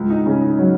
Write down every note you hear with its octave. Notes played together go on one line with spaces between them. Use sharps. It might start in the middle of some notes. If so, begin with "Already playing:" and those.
Already playing: C#2 G#2
D#4
C#3 C#4
D#4
F#3 C#5